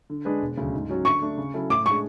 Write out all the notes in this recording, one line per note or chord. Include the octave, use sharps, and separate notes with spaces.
D3
G#3 D4 G#4 B4
E1
D2 C#3 F#3
G#2
F#3 C#4 F#4
D3 C#6
A3 D4
C#3
F#3 C#4 E4 A4
A2 D6
G#3 D4 G#4 C#6